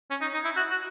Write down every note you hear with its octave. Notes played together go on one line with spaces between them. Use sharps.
C#4
D#4
D#4
E4
F#4
F#4